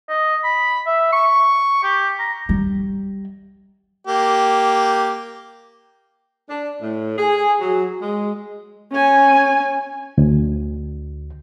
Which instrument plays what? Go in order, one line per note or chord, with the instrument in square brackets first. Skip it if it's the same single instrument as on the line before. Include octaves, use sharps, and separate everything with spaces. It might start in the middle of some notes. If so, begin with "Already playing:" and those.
[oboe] D#5
B5
E5
C#6
G4
A#5
[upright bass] G3
[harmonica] A#3 G4
[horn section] D4
A2
G#4
F#3
G#3
[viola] C#4 G#5
[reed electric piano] D2